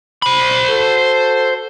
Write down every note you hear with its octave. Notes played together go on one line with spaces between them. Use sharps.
C5 B5
F#4 A4